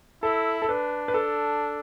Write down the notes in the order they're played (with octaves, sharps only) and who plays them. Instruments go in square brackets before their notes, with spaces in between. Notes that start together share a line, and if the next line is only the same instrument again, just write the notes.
[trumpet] E4 [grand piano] A4
[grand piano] A4
[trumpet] D4 [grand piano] B4
[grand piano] B4
A4